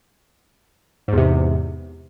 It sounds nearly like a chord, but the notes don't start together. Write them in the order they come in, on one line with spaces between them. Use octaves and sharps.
G#2 E2 C3